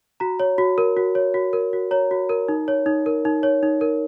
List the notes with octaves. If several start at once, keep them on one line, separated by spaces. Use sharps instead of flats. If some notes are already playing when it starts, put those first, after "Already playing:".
F#4 A#5
C#5
F#4
A#4
F#4
C#5
F#4
A#4
F#4
C#5 A#5
F#4
A#4
D#4
C#5
D#4
A#4
D#4
C#5
D#4
A#4